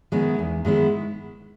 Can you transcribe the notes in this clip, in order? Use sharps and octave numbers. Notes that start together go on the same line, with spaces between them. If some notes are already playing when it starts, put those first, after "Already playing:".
D#3 G#3 B3 E4
E2
D#3 G#3 B3 E4